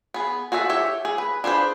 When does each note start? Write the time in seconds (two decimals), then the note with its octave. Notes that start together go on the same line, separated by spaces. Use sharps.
0.14 B3 G#4
0.52 F#4 G#4 A4 E5
0.69 G4 C#5 E5
1.05 G#4
1.18 B4
1.44 D4 G#4 B4 C5